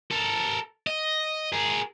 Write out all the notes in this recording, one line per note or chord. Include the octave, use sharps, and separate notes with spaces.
A4 A#4
D#5
G#4 A#4